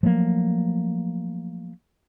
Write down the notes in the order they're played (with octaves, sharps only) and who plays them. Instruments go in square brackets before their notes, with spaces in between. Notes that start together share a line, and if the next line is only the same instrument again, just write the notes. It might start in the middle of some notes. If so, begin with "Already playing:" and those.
[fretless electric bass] F3 F#3 A3 A#3